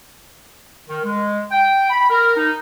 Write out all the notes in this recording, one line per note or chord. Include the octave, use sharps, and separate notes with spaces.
D#3
G#3
G5
B5
A#4
D#4